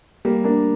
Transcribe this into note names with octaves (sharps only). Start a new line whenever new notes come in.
G3 A#3
A#3 D4